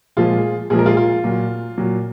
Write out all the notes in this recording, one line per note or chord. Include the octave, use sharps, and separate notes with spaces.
A#2 F3 G#3 F4 G#4
A#2 F3 G#3 G#4
A#4
F4 G#4
F4
A#2 F#3
A#2 F#3